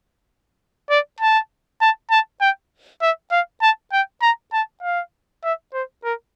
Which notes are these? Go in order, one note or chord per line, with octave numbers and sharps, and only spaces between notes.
D5
A5
A5
A5
G5
E5
F5
A5
G5
A#5
A5
F5
E5
C5
A#4